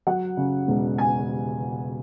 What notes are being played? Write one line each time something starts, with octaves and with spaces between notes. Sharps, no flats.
F#3 F#5
C#3
E1
G#5